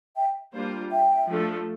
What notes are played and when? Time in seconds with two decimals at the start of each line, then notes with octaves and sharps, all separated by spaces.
0.16 E5 G5
0.54 G3 A#3 D4 F4 C5
0.91 E5 G5
1.28 F3 A3 D4 F4 A4